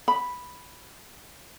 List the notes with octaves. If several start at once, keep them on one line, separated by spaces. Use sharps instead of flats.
B5